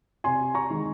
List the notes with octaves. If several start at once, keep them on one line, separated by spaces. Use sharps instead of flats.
C3 G#5 C6
A#5 C#6
D#3 G#3 D#4